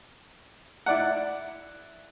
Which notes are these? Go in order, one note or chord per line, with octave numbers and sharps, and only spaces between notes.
E4 D5 F#5